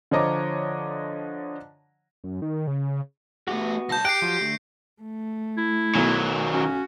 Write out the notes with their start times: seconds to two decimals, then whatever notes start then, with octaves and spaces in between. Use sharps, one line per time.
0.11 D3 F3 C#5 D#5 A#5 D6
2.24 F#2
2.42 D#3
2.67 C#3
3.48 A3 B3 F#4 G4
3.89 C2 A5 G6 A#6
4.05 G4 G5 F#6 C7 D7
4.22 F3 F#3 F4
4.41 D3 A3
5.02 A3
5.57 E4
5.95 B1 D#3 F#3
6.53 C#4 F#4